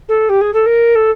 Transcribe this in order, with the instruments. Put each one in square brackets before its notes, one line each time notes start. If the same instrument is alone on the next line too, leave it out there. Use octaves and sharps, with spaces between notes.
[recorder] A4
G4
G#4
A4
A#4
A4